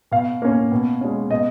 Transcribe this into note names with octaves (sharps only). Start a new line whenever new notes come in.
B2 F5
A#3 C#4
B2
G#3 C#4
B2 D#5